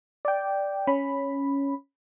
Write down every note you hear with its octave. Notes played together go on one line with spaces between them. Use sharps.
D5 G5
C#4 B5